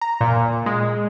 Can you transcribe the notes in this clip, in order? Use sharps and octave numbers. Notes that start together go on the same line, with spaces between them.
A#5
A#2
G#3